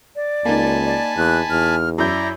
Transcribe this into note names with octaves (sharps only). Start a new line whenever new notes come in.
D5
C#2 A#3 D#4 G#5 A5 B5
D5
E2 F#6
E2 F6
F#2 E4 D5 A#5 G6